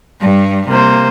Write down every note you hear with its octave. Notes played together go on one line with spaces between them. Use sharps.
G2 G3
C3 A#3 C5